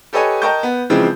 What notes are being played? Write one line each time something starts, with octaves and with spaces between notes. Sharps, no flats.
G4 A4 B4 C#5 D#5 G#5
A#4 D#5 G5 A5 C#6 G6
B3
C#3 E3 F3 G#3 C4